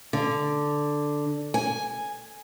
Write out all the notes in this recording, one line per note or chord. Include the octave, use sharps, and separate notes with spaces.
D3
G#5